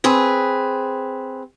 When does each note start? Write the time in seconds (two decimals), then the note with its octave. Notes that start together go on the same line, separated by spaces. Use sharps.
0.04 C4 G#4 B4